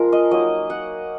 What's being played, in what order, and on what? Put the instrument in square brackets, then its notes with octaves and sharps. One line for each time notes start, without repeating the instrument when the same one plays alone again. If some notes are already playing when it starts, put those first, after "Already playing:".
Already playing: [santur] F3 G#3 F4 A#4
D#5
F#3 A#3 D#4 D#5
F#5